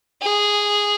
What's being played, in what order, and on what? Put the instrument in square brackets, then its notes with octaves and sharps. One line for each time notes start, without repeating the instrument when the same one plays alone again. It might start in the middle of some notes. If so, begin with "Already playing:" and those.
[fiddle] G#4